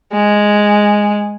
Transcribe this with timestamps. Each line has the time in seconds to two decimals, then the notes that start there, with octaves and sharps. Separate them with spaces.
0.13 G#3